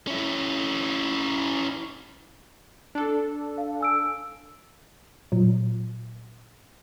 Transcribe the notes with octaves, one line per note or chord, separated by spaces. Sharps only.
C#4 E4
D4 A4
F5
G#5 E6 D7
A#2 F#3